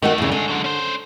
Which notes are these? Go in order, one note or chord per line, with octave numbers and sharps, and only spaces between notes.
G2 D#3 A3 B3 F#4
E2 C#3
D3 D#3 G#3
F#3 G#3
C#4 C5